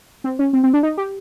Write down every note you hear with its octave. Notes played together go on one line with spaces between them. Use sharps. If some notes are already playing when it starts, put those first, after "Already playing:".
C4
C#4
C4
C4
D4
D#4
G4